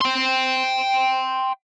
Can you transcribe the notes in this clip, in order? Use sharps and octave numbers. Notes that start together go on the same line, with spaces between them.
G5 C6